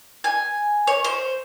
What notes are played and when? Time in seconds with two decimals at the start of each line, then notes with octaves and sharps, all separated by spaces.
0.24 G#5
0.87 C#5
1.04 C5